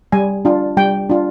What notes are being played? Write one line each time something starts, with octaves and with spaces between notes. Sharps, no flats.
G3 G#5
D4 F4
G3 G5
D4 F4